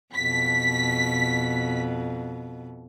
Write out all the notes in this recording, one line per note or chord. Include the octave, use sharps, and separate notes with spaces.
F2 B2 B6